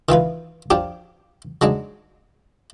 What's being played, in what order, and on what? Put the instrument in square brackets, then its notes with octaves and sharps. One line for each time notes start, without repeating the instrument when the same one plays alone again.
[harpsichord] D#3 E3 F4 B4
F3 D4 G4
F#3 G#3 D4 D#4